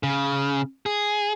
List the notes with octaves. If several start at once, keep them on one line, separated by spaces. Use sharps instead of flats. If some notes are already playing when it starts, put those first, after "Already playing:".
C#3
G#4